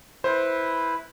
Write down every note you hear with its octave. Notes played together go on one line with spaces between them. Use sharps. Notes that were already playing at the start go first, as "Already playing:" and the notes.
E4 B4 C5